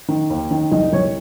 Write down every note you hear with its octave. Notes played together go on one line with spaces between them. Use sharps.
D#3
D#2
D#3
C2 D#4 D#5
C2 C#5